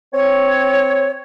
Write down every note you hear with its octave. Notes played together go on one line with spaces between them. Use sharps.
C4 C#5